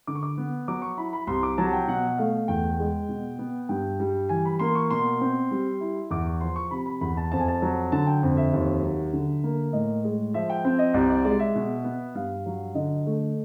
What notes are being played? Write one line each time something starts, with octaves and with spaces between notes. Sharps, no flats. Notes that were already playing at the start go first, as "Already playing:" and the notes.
D3 D6
C#6
D6
B3
F#3 D6
C#6
E4 B5
B5
C2 C6
D6
F#3 A5
G5
B2 F#5
A3 F5
E2 G5
G#3
B2
B3
G2 G5
G3
E3 G#5
B5
A#3 C6
C#6
B2 C6
C4
G3
E4
E2 D6
C#6
F3 C6
C#6
C3 B5
B5
E2 B5
A5
F2 A5
G#5
A5
F#3
D3 A5
G5
F2
E5
D#2
F#3
D3
A#3
A2 D#5
G#3
F3 E5
G5
C4
D#5
C2 D5
D5
G#3 D5
E5
B2
B3
G2 F5
F#3
D3 D#5
A3